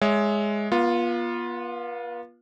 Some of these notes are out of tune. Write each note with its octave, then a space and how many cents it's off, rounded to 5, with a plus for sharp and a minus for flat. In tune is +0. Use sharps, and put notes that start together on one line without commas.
G#3 +0 C#5 +20 E5 +0
B3 -40 F4 +0